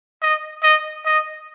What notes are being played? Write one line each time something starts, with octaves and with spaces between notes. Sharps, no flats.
D#5
D#5
D#5